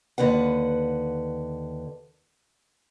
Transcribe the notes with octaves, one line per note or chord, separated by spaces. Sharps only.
D#2 D3 B4 F#5